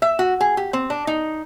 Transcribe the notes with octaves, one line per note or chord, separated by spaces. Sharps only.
E5
F#4
G#4
G4
C4
D4
D#4